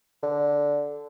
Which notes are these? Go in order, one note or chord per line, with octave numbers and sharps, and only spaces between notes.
D3